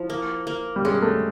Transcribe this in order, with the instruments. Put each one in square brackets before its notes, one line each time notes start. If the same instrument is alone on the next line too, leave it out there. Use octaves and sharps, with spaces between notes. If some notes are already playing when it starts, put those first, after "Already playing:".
Already playing: [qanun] F3 E4
A#3
A#3
[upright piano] G3
[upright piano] G#3 [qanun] C#4
[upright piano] A3